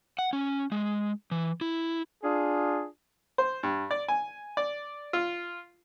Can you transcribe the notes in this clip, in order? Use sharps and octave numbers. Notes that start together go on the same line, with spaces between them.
F#5
C#4
G#3
E3
E4
D4 F4 G#4
C5
G2
D5
G#5
D5
F4